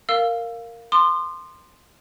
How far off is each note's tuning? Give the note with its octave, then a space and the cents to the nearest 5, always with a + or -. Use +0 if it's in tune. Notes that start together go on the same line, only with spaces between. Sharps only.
A#4 -10 F5 +0 E6 +15
C6 +0 D#6 -45